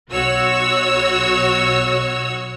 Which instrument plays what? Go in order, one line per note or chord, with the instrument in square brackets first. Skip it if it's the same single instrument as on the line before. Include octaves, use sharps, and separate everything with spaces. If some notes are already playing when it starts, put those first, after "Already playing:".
[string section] B1 F#4 C#5 E6